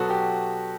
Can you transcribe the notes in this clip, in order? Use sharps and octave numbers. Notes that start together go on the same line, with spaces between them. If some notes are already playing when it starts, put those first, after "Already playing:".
Already playing: B2 F#3 B3 F#4 A4
G4